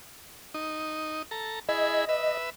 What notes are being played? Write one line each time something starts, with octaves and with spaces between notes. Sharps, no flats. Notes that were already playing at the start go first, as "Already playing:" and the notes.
D#4
A4 A#5
E4 G#4 D#5 B5
B4 E5